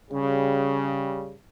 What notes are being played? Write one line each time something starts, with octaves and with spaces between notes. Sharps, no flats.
C#3 G3